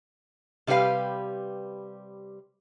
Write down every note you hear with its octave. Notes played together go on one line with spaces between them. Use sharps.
C3 G3 G4 B4 F5